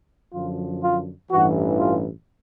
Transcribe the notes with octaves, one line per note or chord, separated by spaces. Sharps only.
F#2 D3 F3 F4
F4
A1 G2 E3 F#4
F4